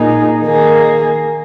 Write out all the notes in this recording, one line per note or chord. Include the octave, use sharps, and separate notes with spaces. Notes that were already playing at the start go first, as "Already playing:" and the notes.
Already playing: A#2 A#3 D#4 G#4
D#3 A#3 G#4